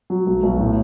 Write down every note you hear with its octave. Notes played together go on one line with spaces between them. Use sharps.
F#3
B1
B1
A2